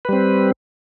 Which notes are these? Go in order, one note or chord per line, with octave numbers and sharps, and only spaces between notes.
G3 C4 B4